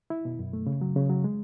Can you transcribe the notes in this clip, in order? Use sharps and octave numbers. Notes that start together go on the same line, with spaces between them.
E4
B2
F#2
A3
C#3
F#3
C#3
F#3
G#3